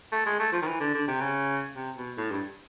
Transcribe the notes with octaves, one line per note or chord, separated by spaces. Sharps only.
A3
G#3
A3
F3
D#3
E3
D3
D3
C3
C#3
C3
B2
A2
G2